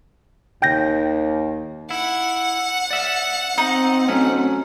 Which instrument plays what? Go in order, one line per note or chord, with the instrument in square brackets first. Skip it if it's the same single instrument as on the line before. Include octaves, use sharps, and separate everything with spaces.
[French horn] D#2 [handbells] G5 G6 A#6
[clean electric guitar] E4 [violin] F#5
[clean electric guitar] D5 E5
[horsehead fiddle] C4 [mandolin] D#4
[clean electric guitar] F#3 A3 C#4